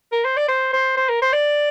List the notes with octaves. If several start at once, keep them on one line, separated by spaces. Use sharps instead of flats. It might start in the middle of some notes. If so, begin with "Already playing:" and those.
A#4
C5
D5
C5
C5
C5
A#4
C5
D5